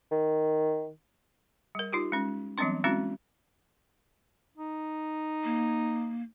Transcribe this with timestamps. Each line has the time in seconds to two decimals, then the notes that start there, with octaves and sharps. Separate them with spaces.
0.12 D#3
1.75 G3 A#4
1.93 D#4 F4 G4
2.12 G#3 C#4
2.58 E3 F#3 G3 B3 C4 D4
2.84 G#3 C4 C#4 E4 F#4
4.58 D#4
5.44 A#3